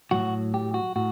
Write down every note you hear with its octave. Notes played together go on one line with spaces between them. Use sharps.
A2 F#3 F#4
G4
F#4
A2 F#4